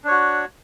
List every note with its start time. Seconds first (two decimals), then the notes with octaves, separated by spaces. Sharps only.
0.04 D4
0.07 C#5
0.11 F#4